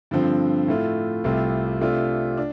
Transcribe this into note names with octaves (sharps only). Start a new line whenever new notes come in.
G2 D3 F3 C4
A2 A3 F4
C2 C3 A3 F4
C3 A3 D4 F4
D4